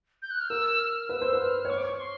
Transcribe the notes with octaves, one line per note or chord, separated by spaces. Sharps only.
G6
F#6
F6
A#4 E6
F6
B4 E6
C5
B4
F6
C#5
C5 C#6
D6
C#6
C6